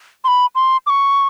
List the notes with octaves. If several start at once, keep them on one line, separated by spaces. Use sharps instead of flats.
C6
B5
C6
D6
C#6